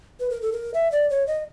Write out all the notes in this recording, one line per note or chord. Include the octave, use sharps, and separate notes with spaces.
B4
A#4
A4
A#4
E5
D5
C#5
D#5